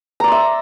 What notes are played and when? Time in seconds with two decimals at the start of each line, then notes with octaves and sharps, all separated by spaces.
0.20 A#5
0.24 D5
0.28 C6
0.32 E5